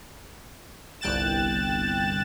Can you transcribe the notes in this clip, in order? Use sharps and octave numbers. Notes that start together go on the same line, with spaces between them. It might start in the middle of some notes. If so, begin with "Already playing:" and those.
G1 C2 G5 F#6 A6 E7